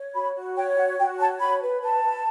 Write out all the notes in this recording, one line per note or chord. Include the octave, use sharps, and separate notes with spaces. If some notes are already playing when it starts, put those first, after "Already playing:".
Already playing: C#5
F#4 B5
F#4
C#5 G5
F#4 F#5
F#4 G5
C#5 A5
F#4 B5
B4
B4 A5
B4